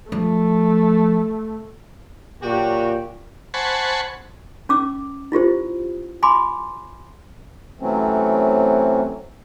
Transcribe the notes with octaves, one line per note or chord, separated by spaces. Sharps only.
F3 A3
A#2 F#3 F#4 G4
C5 F#5 G#5 A5 B5 C#6
C#4 D6 E6
E4 F4 G4 C5
G#5 B5 C6 D6
C3 E3 F#3 A3 C4 C#4